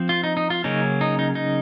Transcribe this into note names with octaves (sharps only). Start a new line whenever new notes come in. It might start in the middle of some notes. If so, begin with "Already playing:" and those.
Already playing: F3 C4
F4
D#4
D#4
F4
C#3 F#3 A#3 C#4 D#4
D#4
D#4
D#4